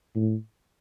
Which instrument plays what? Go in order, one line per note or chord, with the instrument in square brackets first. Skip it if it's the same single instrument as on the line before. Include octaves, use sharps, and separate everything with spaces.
[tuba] A2